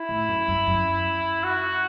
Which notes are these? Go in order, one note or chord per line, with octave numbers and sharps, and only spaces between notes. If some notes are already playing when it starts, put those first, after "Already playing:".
Already playing: E4
A2
F#2
F#2
F#2
F#4